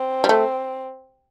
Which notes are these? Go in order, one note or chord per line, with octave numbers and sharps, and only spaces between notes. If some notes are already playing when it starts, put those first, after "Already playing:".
Already playing: C4
G3
A3